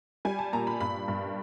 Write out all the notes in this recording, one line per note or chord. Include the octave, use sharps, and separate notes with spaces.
G3 G#5
A5
A#2 A#5
B5
G2 B5
G2